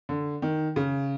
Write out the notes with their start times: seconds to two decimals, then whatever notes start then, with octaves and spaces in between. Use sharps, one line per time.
0.09 D3
0.42 D#3
0.76 C#3